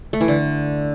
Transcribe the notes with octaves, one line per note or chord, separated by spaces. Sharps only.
A3
E3
D3